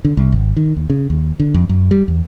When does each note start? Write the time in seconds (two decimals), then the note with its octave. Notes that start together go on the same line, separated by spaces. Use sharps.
0.05 D3
0.17 C2
0.32 G#1
0.57 D#3
0.77 D#2
0.90 C#3
1.10 D#2
1.40 D3
1.54 F2
1.69 F#2
1.91 G3
2.08 E2